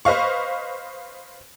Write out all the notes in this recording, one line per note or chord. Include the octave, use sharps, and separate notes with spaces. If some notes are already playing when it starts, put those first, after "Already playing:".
B4 C5 D#5 F5 C#6